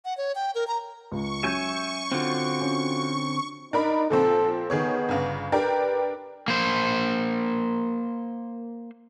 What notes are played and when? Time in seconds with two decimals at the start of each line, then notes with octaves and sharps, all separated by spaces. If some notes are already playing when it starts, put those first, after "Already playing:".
0.05 F#5
0.17 C#5
0.35 G5
0.55 A#4
0.67 A#5
1.12 C#2 C#6
1.43 F#3 C#4 E5 G#5 G6
2.12 D3 C4 F4 F#4
2.61 C#4
3.73 D4 D#4 A#4 B5
4.10 A#2 F3 C4 A4
4.70 D#3 B3 G#4 C#5
5.09 G1 C#3
5.52 D4 G4 A#4 B4
6.48 A#3 C5